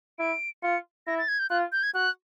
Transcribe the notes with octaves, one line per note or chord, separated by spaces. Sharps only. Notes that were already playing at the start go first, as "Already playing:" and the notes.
E4 D7
F4 C#7
E4 A#6
A6
G#6
G6
F4 F#6
G6
G#6
F#4 F#6